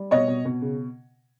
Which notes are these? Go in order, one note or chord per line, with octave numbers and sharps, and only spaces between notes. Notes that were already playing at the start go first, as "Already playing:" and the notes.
Already playing: G3
B2 C#5 D#5
B2
B2
C#3